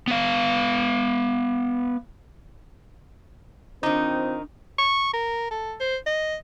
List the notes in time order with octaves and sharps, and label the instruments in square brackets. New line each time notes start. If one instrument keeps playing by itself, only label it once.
[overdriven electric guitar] B3 F5
[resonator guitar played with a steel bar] D#3 D#4 [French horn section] C4 F4 C5 [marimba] D4
[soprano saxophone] C#6
A#4
A4
C5
D#5